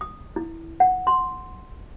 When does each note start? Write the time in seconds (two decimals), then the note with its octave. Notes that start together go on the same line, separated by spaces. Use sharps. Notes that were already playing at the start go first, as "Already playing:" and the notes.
0.01 D#6
0.36 E4
0.80 F#5
1.07 C6